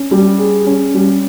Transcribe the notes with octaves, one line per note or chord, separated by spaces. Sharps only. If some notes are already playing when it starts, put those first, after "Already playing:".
Already playing: C#4
G3
G#4
C#4
G3